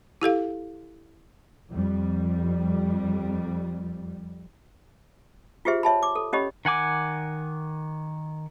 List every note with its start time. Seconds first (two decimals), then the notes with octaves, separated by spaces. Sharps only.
0.22 E4 G4 A4 F5
1.70 F2 G3
5.65 F4 G4 G#4 C5 E5
5.83 C#5 E5 A5 B5
6.03 D6
6.16 A4
6.33 C#4 G4 C#5 D#5 B5
6.65 D#3 F#5 G#5 D6